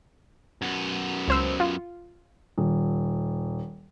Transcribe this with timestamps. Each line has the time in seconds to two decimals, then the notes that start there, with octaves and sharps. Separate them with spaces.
0.62 F#2 B3
1.28 C#2 C5 E6
1.60 F4
2.58 D#1